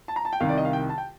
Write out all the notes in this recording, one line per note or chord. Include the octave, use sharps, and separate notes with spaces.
A5
A#5
A5
G5
C2 C3 D#3 F5
D5
D#5
F5
G5
A5
G5